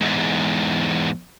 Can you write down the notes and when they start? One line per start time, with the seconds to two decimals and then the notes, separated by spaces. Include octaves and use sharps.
0.01 E2 G#2